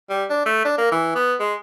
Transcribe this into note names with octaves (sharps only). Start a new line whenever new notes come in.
G3
D4
A3
D4
A#3
E3
B3
G#3